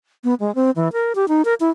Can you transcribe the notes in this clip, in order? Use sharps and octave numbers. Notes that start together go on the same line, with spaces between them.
B3
G#3
C4
E3
A#4
G4
D#4
A#4
E4